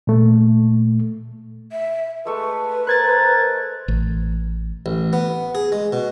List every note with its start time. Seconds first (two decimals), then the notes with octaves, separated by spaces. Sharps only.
0.07 A#2 A3
1.72 E5
2.25 G#3 A3 B4 C#6
2.87 A#4 C5 F#6 G#6 A6
3.88 A1
4.86 A1
5.13 B3
5.55 G#4
5.72 G#3
5.92 B2